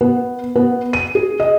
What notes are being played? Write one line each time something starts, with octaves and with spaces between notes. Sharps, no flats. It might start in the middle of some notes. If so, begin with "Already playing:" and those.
B3
B3
D#7
G#4
D#5